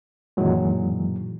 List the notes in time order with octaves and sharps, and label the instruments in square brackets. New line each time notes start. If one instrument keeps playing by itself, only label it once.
[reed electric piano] F#2 A#2 D#3 E3 F#3 G#3